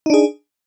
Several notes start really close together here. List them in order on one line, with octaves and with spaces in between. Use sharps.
D#4 D4 G#4